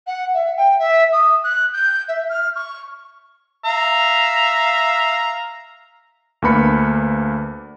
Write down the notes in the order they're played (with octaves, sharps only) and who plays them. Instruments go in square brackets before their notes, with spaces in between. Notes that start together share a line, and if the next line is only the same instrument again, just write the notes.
[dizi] F#5
E5
G5
E5
D#6
F#6
G6
E5
F6
C#6
[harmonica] E5 F5 A#5
[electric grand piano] D2 A#3 D4 B4 B5 C#7